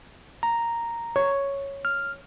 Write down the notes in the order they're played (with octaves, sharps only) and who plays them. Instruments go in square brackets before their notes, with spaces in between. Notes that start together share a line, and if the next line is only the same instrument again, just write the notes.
[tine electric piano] A#5
[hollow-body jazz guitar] C#5
[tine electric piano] F6